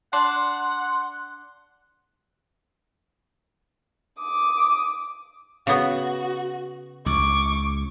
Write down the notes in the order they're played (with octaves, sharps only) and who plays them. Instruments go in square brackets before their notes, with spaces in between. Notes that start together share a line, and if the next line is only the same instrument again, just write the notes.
[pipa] D4 [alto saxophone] F#5 [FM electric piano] C6 F#6
[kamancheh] D6 D#6
[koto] C#3 B3 [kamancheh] F#4
[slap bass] C#2 [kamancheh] C#6 D6